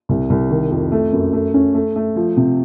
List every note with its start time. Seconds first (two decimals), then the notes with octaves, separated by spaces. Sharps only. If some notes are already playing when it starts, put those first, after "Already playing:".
0.09 C2
0.30 C2
0.50 D#3
0.71 F2
0.92 A3
1.13 F#2
1.33 A3
1.54 C#4
1.74 A3
1.96 A3
2.16 F3
2.37 C3